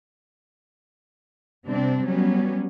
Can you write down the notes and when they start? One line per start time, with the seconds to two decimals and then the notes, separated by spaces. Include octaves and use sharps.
1.65 C3 G3 C4 D4
2.06 F#3 G3 B3 C#4